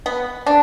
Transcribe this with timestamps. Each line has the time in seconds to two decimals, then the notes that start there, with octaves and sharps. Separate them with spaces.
0.06 B3
0.47 D4